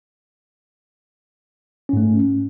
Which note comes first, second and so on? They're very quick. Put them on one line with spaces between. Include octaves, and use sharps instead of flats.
C#4 G#2 A3